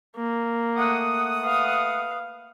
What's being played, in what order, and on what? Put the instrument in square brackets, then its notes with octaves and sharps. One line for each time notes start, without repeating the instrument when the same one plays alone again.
[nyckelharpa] A#3
[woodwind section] A3 F#5 D#6
[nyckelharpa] B4 F5